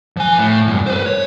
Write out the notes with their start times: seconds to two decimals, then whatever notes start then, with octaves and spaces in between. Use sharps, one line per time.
0.17 F3 G#5
0.39 A2
0.67 E2 G2
0.86 B4 C5
1.06 C#5